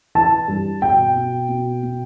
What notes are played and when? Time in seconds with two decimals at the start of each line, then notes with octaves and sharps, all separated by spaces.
0.15 E3 A5
0.48 G2
0.82 B2 G5
1.15 B2
1.49 B2
1.83 B2